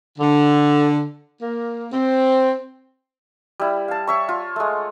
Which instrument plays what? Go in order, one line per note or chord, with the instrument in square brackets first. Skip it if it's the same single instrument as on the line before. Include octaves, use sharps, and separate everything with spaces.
[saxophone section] D3
A#3
C4
[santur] G3 E4
F5 A5
C#5 E5 C#6
F4
G#3 A3